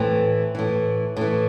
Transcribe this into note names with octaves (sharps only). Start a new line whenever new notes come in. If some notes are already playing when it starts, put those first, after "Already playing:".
Already playing: A2 E3 C4
A2 E3
A2 E3